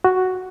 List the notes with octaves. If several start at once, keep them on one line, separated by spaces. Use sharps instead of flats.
F#4